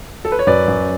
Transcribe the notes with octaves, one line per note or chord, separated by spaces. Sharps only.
A4
B4
C#5
F#2 B4 D5
F#2